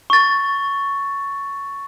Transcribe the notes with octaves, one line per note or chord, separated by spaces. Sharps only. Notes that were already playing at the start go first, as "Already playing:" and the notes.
C#6 A6